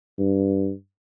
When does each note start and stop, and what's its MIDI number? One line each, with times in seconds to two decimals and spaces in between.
0.19 0.71 43